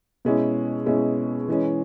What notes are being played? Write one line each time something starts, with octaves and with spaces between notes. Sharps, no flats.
B2 G#3 C#4 E4
B2 G#3 C#4 E4
E3 G#3 C#4